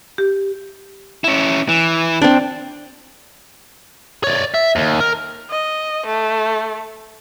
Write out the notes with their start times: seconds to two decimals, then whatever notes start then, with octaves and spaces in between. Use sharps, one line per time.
0.18 G4
1.24 C#4 E4
1.69 E3
2.22 C4 D4
4.24 C#5 D5
4.54 E5
4.76 D#2
5.00 A#4
5.50 D#5
6.06 A3